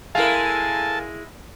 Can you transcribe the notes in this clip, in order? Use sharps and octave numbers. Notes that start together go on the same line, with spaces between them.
G#3 E4 A4 A#4 F5 G#5 A5